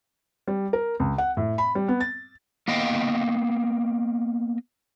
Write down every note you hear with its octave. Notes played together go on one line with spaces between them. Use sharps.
G3
A#4
C#2
F#5
A2
B5
G3
B3
A6
A#3 B3 D#5 F5 G5